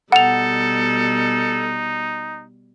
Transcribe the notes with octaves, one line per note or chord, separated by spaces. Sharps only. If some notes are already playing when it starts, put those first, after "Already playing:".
B2 G3 D#4 A4 F#5 F7